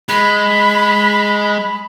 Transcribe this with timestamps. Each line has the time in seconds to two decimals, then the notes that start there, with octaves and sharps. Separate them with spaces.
0.09 G#3 B5